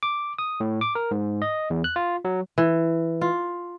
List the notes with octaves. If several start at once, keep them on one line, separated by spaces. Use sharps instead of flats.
D6
D#6
A2
D6
A#4
G#2
D#5
E2
F#6
F4
F#3
E3
F4